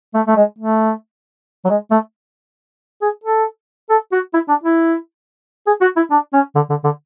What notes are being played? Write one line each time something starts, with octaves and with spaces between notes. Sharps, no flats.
A3
A3
G#3
A3
F#3
G#3
A3
G#4
A4
A4
F#4
E4
D4
E4
G#4
F#4
E4
D4
C#4
D3
D3
D3